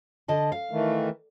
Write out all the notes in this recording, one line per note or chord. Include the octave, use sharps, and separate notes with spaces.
D3 D#5 A5
F5
D#3 E3 A3